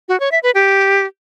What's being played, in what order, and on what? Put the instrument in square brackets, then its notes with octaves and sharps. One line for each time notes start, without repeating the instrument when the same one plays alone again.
[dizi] F#4
C#5
E5
B4
G4